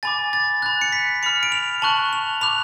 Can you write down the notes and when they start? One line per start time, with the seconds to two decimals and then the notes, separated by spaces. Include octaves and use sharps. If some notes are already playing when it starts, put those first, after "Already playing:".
0.03 G#5 B5 D6 A6
0.33 A6
0.62 B5 F#6 A6
0.81 C#7
0.92 B6
1.23 B5 F6 C#7
1.43 D7
1.52 F7
1.82 A5 C#6 F#6 F#7
2.13 F7
2.41 B5 D6 F#6 F7